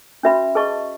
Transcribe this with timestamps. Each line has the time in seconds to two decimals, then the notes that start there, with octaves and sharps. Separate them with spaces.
0.23 C#4 F#4 B4 E5 B5
0.55 G#4 B4 D#5 A5 C#6